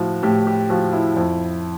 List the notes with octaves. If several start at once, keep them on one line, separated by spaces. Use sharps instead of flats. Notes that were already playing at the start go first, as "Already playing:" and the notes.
Already playing: A2 F3 E4 F#4
A2 G4
G4
F3 F#4
E4
F2